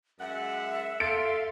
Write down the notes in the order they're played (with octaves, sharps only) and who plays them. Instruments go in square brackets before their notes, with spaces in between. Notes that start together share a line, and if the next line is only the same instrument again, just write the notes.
[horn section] F#2 G#3 F#5 [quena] E5
[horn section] A4 [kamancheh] F5 C6 [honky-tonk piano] A6 C#7 D7